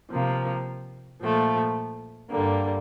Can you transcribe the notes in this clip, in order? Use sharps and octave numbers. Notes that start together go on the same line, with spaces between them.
C3 F3 A#3
A#2 F3 A3
G2 D3 G3 A#3